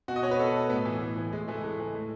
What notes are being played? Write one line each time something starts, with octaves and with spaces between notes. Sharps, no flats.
B2 F#4
D#5
C#5
B4
B2 A4
A2 B3
E3
A2
E3
A2 G#3
E3 A3
A2 G#3
E3
A2